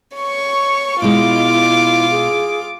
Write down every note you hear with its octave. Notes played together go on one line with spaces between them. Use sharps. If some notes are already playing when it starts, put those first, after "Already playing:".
C#5 C#6
B2 G#3 E4 F4 D#5 D6
G#4